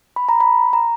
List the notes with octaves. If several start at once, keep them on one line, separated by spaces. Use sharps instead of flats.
B5
A#5
B5
A#5